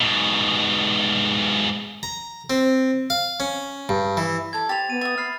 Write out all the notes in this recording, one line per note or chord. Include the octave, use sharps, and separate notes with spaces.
G#2 B2
A#5
C4
F5
C#4
G2
E3
E4 A4 D5 G#6
G4 C5 A6 F7
B3 D#7
E5 D#6 A6
B5 F6 C7